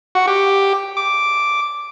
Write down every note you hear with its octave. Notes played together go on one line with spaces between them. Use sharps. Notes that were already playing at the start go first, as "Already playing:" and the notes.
F#4
G4
D6